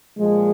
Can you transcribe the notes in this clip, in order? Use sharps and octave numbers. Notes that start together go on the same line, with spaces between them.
A#2 F3 G#3